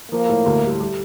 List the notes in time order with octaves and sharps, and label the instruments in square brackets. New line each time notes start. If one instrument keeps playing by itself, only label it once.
[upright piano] F3 [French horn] A#3
[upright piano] A2
D2
G3
G3